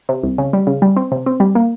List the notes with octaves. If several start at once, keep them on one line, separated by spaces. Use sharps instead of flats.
C3
C2
C#3
G3
C#3
G3
C4
C3
C4
G3
A#3